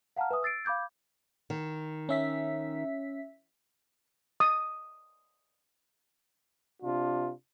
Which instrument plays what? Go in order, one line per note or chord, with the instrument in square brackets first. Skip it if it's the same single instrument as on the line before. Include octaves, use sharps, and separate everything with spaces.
[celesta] F5 F#5 A5 A#5 F6
B4 E5 G#5 D#6
E6 A6 C7 D7
F5 B5 D6 G6 G#6
[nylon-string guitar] D#3
[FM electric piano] C#4 E5 B6
[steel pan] D#6
[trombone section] C3 D4 F4